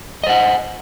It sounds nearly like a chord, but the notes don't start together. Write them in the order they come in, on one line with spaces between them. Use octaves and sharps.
D#5 C5 F#5